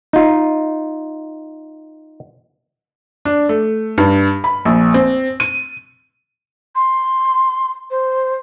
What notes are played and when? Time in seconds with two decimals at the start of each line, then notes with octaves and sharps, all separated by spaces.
0.13 D#4 F4
3.25 D4
3.49 A3
3.98 G2
4.44 B5
4.65 A#1
4.94 C4
5.40 D#7
6.75 C6
7.91 C5